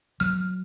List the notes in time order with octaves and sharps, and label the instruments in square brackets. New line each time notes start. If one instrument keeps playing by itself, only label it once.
[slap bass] F#3 [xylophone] F6